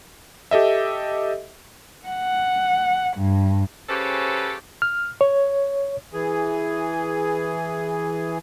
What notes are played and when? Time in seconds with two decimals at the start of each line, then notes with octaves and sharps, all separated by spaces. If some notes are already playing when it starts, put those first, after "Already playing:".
0.51 G4 A4 D#5 E5
2.07 F#5
3.17 G2
3.89 C#3 C#4 G4 A4 B4 C5
4.82 F6
5.21 C#5
6.13 E3 G#4